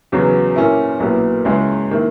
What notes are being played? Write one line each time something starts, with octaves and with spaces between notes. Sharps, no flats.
E2 C#3 F#3 B3
A#2 A#3 C#4 E4
B1 A#2 F#3 B3 E4
C#2 C#3 G#3 C#4 E4
D#3 A#3 E4